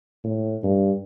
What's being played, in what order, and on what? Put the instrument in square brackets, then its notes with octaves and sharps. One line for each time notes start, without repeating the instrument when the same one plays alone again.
[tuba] A2
G2